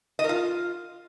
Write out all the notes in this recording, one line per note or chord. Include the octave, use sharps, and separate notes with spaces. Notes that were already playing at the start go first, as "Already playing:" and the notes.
D#5
A#4
F4